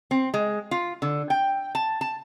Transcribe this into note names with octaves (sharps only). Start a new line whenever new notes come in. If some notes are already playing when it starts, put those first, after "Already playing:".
C4
G#3
F4
D3
G5
A5
A5